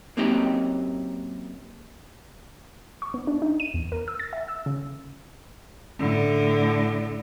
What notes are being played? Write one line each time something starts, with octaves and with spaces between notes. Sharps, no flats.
F#2 A#3 C4 D#4 G4 D#5
C#6
B3
D4
D#4
D#7
E2
A#4
E6
A6
E5
E6
C#3
A2 D3